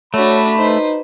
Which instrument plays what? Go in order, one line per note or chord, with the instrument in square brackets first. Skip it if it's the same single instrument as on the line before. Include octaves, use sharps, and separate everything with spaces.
[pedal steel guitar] A3 [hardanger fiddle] D4 F#4 [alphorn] C#5 [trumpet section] B5
[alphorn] D#4 [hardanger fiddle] B4 C5